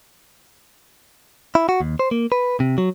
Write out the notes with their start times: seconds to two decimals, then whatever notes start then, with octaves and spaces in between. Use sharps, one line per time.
1.55 E4
1.69 F#4
1.81 D#2
1.99 C5
2.11 A#3
2.32 B4
2.60 C3
2.78 F#3